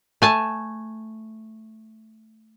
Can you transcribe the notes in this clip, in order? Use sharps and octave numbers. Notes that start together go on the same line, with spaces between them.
A3 G#5 A5